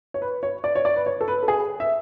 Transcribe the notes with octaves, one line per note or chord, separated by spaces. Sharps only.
C#5
B4
C#5
D5
C#5
D5
B4
C#5
A4
B4
A4
G#4
E5